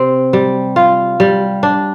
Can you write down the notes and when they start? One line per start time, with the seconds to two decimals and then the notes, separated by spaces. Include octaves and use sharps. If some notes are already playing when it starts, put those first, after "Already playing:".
Already playing: C3 C4
0.33 G3
0.76 F4
1.20 G3
1.63 D4